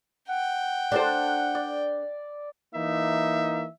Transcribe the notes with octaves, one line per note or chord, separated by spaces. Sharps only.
F#5 G5
D4 A4 C5
D5
E3 A#3 D#4 E5